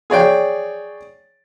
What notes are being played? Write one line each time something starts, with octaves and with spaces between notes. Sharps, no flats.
G#4 C#5 D5 G5